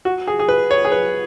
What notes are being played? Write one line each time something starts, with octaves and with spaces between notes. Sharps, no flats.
F#4
G#4
G#4
B4
C#5
G#4
B4